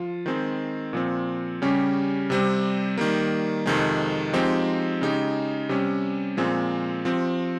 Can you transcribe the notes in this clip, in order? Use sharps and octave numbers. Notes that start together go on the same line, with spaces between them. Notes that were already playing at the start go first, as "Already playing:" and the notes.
Already playing: F3 F4
D#3 G#3 C4
A#2 F3 C4
C#3 G3 C#4 G4
C3 G3 C4
D#3 G3 A#3
F2 C3 D#3 G#3
F3 G#3 C4 D#4 G4
C#3 G#3 D#4 G4
C3 G3 C#4
A#2 F3 G#3 C4
F3 C4 G4